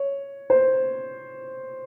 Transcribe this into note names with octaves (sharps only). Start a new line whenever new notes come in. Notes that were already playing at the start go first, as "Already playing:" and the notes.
Already playing: C#5
C5